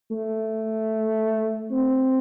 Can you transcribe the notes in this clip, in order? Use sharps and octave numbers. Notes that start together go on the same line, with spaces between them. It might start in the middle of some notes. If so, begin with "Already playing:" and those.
A3
C4